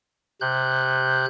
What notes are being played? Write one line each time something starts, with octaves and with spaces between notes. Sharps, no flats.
C3 F#6 G6